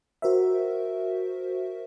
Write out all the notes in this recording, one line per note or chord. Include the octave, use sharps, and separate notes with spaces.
F#4 A#4 C5 E5